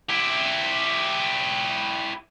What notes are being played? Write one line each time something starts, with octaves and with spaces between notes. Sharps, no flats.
E4 G4